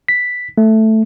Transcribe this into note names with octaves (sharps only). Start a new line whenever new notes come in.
B6
A3